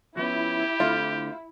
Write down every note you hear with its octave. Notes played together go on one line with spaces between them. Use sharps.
F3 B3 C#4 E4 G4
D3 A3 C4 F4